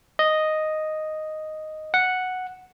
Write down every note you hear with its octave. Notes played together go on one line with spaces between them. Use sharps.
D#5
F#5